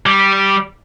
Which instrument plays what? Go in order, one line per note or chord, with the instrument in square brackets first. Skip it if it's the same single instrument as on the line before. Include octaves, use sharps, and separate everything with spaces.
[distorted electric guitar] G3